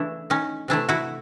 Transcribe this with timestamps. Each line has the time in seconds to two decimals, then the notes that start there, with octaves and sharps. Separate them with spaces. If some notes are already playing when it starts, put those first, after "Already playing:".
Already playing: C#3 E3 A3 D4 E4
0.30 C#4 D#4
0.68 C3 E3 A3 D4 E4
0.89 E4 F#4